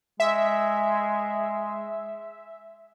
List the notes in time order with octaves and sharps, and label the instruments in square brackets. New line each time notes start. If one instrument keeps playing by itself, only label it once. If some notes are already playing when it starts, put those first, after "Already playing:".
[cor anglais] G#3 [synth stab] E5